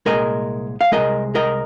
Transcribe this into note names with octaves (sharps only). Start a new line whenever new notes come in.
C2 A#2 G#3 A#4 D#5
F5
C2 A#2 G#3 A#4 D#5
A#4 D#5